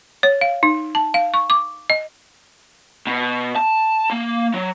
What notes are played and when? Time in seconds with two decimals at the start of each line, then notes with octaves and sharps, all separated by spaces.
0.23 C#5
0.41 F5
0.63 D#4
0.95 A5
1.14 F5
1.34 C#6
1.50 D6
1.90 D#5
3.07 B2
3.56 A5
4.10 A#3
4.54 F#3